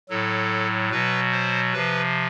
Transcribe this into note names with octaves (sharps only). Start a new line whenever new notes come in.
A2 F#3 A4
B2 F#3 B4
C5
C3 F3 B4